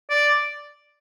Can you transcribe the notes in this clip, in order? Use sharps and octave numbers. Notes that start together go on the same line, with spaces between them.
D5